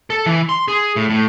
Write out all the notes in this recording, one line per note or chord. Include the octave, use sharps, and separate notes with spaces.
A4
E3
C6
G#4
A2
A2